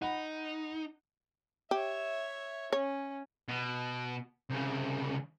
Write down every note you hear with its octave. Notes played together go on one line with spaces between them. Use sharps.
D#4 F#5 B5
G4 C#5 E5
C#4 C#5
B2
C2 C#3